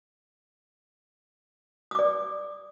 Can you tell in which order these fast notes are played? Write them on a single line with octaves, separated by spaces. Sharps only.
D#6 D6 D5